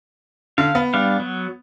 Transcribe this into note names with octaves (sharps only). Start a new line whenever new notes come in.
D3 F5
B3
G3 D4 F5
F#3